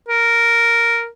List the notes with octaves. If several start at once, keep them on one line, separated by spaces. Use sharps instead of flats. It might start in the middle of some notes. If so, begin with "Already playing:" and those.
A#4